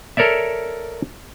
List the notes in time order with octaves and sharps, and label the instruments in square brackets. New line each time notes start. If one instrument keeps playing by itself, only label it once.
[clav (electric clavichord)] A4 A#4 C#5 D5 E5